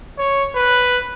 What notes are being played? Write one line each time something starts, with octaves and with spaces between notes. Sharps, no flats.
C#5
B4